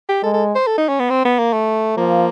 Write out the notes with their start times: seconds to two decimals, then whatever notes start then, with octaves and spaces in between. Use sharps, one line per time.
0.09 G4
0.23 G#3 A4
0.34 A4
0.55 C5
0.67 A4
0.78 D#4
0.89 C#4
1.00 B3
1.10 C4
1.25 B3
1.39 A#3
1.53 A3
1.97 F3 A#3